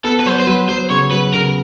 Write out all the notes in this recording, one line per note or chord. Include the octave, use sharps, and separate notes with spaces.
B3 A4
B4
F#3 C5
C5
F#3 B4
F#3 C5
C#3 C#5
F#3 B4
C#3 A#4